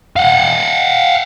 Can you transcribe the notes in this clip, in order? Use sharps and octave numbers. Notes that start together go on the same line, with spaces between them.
F5 F#5